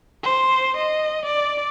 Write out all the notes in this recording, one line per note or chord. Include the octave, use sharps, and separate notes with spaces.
C5
D#5
D5